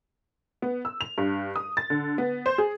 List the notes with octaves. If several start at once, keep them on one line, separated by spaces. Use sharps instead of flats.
B3
E6
F7
G2
D#6
A6
D3
B3
C5
G#4